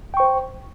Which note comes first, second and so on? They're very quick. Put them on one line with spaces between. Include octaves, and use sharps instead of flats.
G5 C#6 C5